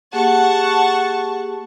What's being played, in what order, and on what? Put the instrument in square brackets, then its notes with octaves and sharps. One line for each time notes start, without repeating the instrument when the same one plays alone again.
[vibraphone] A#3 G4 G#4 [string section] F#5 A5 C#6